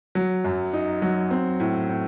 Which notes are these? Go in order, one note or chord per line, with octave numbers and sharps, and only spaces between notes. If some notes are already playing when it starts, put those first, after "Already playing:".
F#3
F#2
D#4
F#3
C4
A2
A2